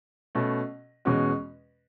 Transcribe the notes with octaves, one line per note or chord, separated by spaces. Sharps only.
B2 A3 C#4
E2 B2 G#3 C#4 F#4